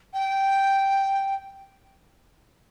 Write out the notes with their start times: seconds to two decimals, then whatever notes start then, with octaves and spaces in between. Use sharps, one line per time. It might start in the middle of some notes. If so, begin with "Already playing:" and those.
0.13 G5